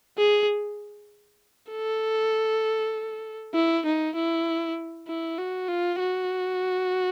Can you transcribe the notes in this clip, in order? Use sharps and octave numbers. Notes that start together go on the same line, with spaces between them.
G#4
A4
E4
D#4
E4
E4
F#4
F4
F#4